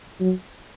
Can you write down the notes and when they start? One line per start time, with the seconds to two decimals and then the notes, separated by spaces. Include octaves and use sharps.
0.21 F#3